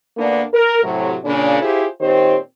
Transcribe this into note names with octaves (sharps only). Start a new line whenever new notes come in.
D2 A#3 B3 D4
A#4
A2 C3 F#3
A#2 C#3 D4
E4 F4 G4 G#4 C5
A#2 D#3 C4 G4 C5 C#5